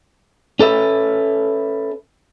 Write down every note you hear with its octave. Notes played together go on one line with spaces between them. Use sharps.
C#4 A4 B4 E5